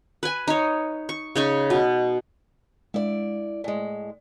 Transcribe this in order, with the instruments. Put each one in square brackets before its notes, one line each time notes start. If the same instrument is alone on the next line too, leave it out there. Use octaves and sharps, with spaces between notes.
[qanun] B4 G#5
D#4 C#5
C#6
C#3 D#4 C#6
B2
[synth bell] G#3 [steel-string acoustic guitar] E4 D5
[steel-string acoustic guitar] A2 G#3 [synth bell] D5